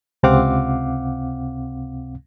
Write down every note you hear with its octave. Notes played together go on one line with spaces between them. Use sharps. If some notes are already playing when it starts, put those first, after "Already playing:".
C#2 C3 C4 F5 F#5 D6